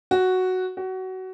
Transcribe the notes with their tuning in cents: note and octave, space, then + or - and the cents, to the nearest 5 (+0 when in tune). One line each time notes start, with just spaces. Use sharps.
F#4 +0
F#4 +20